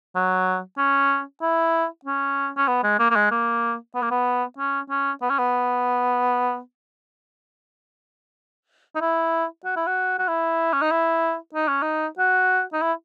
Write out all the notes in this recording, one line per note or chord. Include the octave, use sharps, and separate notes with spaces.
F#3
C#4
E4
C#4
C#4
B3
G#3
A#3
A#3
G#3
A#3
B3
A#3
B3
C#4
C#4
B3
C#4
B3
D#4
E4
F#4
E4
F#4
F#4
E4
C#4
D#4
E4
D#4
C#4
D#4
F#4
D#4
E4